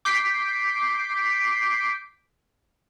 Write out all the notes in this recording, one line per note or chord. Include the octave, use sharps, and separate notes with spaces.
D6 G6 B6 C7 D7